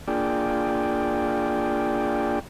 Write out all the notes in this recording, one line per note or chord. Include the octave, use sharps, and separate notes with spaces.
A#3 D4 F4 G#4 D5 G5